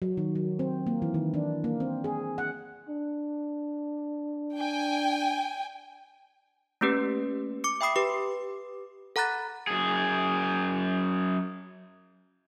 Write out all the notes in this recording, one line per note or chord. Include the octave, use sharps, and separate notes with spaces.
F#3
D#3
F#3
C4
A#3
E3
D#3
D4
A#3
C4
G#4
F#5
D4
G5 G#5
A3 A#3 C#4 G4 B4
D6 C#7
E5 G5 B5 D#6 C7
G4 B4 D6
A4 F#5 A#5 B5 F#6 A6
F#2 G#4